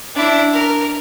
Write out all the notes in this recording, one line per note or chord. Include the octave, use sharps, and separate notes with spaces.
D4 E4
A#4